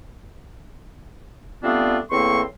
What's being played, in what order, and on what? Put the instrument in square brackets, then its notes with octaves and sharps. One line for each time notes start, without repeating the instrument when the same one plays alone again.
[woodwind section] G3 A3 B3 C4 D4 F4
E2 A2 A#3 C4 C6 C#6